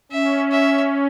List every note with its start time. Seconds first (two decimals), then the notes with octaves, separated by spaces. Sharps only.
0.11 C#4 E5
0.52 E5